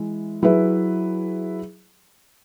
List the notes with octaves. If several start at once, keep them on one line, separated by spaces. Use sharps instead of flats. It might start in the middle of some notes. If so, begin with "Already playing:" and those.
Already playing: E3 G#3 E4
F#3 E4 G#4 B4 E5